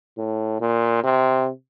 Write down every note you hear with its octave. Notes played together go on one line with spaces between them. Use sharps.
A2
A#2
C3